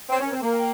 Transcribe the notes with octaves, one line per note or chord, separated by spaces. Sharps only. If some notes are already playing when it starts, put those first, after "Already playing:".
C4 C#5
C#4 A#4
C4
A#3 A#4
G5